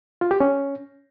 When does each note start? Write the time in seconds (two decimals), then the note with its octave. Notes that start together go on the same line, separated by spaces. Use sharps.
0.21 F4
0.31 G4
0.40 C#4